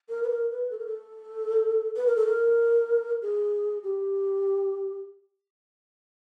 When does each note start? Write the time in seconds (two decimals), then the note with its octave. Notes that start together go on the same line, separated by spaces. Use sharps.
0.09 A#4
0.23 B4
0.30 A#4
0.51 B4
0.71 A4
0.79 A#4
0.86 A4
1.96 B4
2.07 A#4
2.16 A4
2.27 A#4
3.22 G#4
3.84 G4